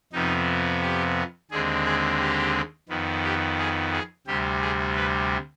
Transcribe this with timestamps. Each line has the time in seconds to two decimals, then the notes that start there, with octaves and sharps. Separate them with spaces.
0.13 F2 C3 F3 B3 D#4
0.82 G4
1.51 D#2 D3 G#3 C4 G#4
1.85 G#4
2.20 G4
2.89 F2 D#3 B3
3.24 G4
3.58 G#4
3.92 G#4
4.27 D2 C3 G3 G4
4.61 G#4
4.96 B4